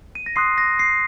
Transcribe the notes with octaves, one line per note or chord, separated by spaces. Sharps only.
D#7
A#6
C6 D#6 F#6 C7
A#6
C7